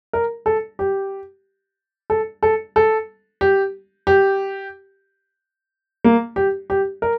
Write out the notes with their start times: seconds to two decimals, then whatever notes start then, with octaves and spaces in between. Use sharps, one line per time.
0.13 A#4
0.46 A4
0.79 G4
2.10 A4
2.43 A4
2.76 A4
3.41 G4
4.07 G4
6.04 A#3
6.36 G4
6.70 G4
7.02 A#4